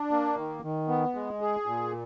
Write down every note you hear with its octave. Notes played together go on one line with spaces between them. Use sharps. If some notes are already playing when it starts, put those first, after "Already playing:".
Already playing: D4
A#3
D#3
D#3
B3
G#3
G#4
A#2